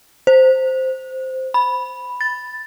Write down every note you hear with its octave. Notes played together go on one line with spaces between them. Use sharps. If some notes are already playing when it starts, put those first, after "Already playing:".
C5
B5
A6